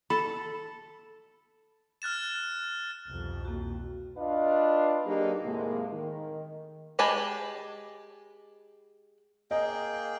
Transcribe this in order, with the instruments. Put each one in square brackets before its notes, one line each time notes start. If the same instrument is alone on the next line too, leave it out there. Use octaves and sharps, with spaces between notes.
[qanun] A4 [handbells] B5
[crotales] F6 F#6 A6 E7
[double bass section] C2 F2 B2
[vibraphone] A#3 F#4
[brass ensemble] D4 F4 B4 D5 D#5 F5
F#3 A#3 D4 D#4 G4 G#4
D#2 A2 C3 G#3 A#3
D#3
[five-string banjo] G#3 G4 G#5 A5 B5
[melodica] A#3 G#4 G5 [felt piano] D#5